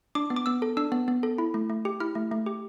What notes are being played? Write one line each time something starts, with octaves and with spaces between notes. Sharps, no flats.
D4 D6
B3
D6
B3 E6
A4
D4 E6
B3
B3
A4
E4
A3
A3
G4
E4 F6
A3
A3
G4